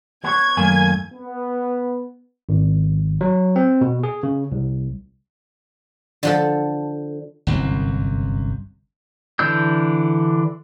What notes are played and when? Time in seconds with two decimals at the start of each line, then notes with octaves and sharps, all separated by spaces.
0.24 B3 C#5 G#6
0.57 F#2 D#3 A3 A#3 G#5
1.13 B3
2.49 G#1
3.21 F#3
3.56 C4
3.81 B2
4.03 G#4
4.23 C#3
4.52 C2
6.23 D3 F3 A4
7.47 G1 C2 F#2
9.39 D3 E3 D4 E6 G6